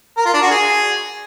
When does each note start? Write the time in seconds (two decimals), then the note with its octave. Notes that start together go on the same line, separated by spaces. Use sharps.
0.17 A#4
0.25 F4
0.34 D4
0.42 F#4
0.50 G#4